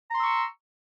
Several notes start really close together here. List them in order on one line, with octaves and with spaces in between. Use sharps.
A#5 C6 E6 C#6